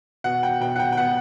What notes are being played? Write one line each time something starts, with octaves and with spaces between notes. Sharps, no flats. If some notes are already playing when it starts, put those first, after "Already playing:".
B2 F#5
G5
B2 G5
F#5
G5
G5
B3 F#5